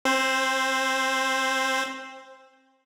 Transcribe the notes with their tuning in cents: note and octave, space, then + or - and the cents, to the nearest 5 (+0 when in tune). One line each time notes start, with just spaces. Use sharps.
C4 +25 C5 +0